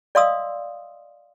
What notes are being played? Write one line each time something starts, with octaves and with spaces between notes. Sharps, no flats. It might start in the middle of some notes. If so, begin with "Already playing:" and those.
D5 D#5 F5 C6 D#6 E6